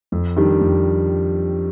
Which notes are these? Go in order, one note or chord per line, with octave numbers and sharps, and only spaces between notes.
F2
D#3 G3 D4
F2